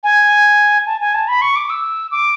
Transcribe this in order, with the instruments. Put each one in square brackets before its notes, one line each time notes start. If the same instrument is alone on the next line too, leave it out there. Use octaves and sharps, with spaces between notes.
[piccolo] G#5
A5
G#5
A5
B5
C#6
D6
E6
D6